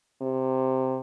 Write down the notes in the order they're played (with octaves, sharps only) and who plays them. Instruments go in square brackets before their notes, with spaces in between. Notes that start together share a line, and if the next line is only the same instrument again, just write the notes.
[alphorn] C3